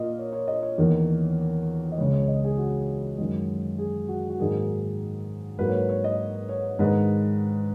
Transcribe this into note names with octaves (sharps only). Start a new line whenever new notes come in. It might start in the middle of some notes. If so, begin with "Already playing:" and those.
Already playing: A#2 A#3 D#5
C#5
C#5
D#5
C#5
E2 D#3 A#3
D#5
C#2 C#3 G#3 C#5
C#5
D#5
G#4
F#4
F#2 D#3 G#3
G#4
F#4
F#4
G#2 D#3 F#3 A#3 G#4
G#2 F#3 A#3 B4
C#5
B4
C#5
D#5
C#5
G#2 D#3 G#3 B4